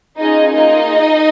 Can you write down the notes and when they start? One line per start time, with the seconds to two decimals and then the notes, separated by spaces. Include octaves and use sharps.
0.18 C#4 D#4 F4 G#4 D#5
0.50 A#3 D#4 F4 G#4 D#5